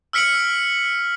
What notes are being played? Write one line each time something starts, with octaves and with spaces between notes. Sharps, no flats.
E6 F6 B6 C#7 D7 F#7